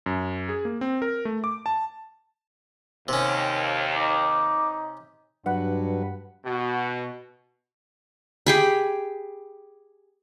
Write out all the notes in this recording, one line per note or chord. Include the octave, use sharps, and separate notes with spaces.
F#2
G#4
A#3
C4
A#4
A3
D6
A5
D#2 C3 C#4
D#4 D6
G2 F#3 D4 B4 F#5
B2 F#4
G4 G#4 B5